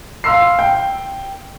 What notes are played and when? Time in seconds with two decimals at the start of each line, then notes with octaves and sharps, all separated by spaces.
0.24 F5 C6 E6 C7
0.59 G5